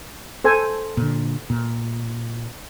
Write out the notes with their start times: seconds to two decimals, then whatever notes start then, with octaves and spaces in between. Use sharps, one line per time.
0.44 A4 C5 G#5
0.97 A#2 D3
1.50 A#2